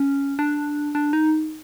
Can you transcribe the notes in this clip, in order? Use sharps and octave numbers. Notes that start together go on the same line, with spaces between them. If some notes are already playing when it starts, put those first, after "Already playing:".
Already playing: C#4
D4
D4
D#4